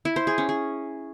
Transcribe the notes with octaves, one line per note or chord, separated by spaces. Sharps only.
E4
C5
G#4
C#4
G#4